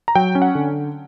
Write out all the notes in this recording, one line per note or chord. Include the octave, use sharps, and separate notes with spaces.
A#5
F#3 G5
C#4
F#5
D3